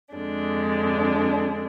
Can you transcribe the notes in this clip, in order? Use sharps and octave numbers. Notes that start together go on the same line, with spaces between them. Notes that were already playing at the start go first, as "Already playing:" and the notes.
F2 D3 G#3 D4